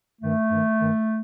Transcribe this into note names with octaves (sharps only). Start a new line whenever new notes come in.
G2 D#3 A3
G2 D#3
G2 D#3